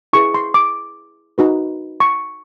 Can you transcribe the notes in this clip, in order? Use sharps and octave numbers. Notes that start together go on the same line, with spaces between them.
E4 G#4 B4 C#6
C6
D6
D#4 F#4 B4
C#6